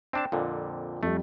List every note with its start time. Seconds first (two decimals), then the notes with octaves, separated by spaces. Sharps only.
0.13 C4 D4 G5 A5
0.32 F2 A#2 D3
1.03 F2 G3 A3